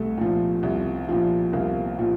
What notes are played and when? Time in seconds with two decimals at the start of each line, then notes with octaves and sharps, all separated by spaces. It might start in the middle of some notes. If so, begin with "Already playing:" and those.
Already playing: C2 A3
0.18 A#2 F3
0.63 C2
1.09 A#2 F3
1.53 C2 A#3
1.99 A#2 F3